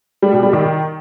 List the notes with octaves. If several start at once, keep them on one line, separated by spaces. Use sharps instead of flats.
G3
B2
G3
D#3